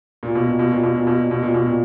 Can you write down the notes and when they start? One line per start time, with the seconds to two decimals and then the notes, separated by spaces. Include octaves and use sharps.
0.23 A#2
0.35 B2
0.47 A#2
0.59 B2
0.72 A#2
0.83 B2
0.95 A#2
1.07 B2
1.18 A#2
1.31 B2
1.43 A#2
1.54 B2
1.66 A#2